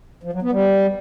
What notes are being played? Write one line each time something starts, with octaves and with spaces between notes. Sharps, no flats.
F3
F#3
B3
G3